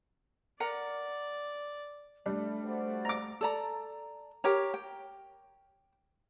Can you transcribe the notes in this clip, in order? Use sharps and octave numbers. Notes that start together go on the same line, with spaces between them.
A#4 D5 F#5 A#5
G3 A3 D4
F#4 C5 D5
A#5 D6
A4 D5 A#5
G4 A#4 C#5 A#5
G5